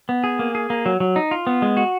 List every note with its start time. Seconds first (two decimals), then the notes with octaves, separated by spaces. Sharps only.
0.09 B3
0.24 G#4
0.39 A#3
0.55 G#4
0.70 A#3
0.86 F#3
1.00 F#3
1.16 D#4
1.31 F4
1.47 B3
1.62 G#3
1.77 F#4